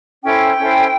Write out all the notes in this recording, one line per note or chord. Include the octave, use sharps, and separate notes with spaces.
C#4 E4 A4 C5 G5
C#4 E4 A4 C5